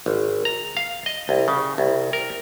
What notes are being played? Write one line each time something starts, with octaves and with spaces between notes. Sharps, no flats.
G#1
A#5
F5
D#5
C2
C#3
C2
A#4